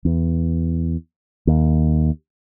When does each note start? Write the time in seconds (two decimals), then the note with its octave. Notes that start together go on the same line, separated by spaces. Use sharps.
0.05 E2
1.47 D#2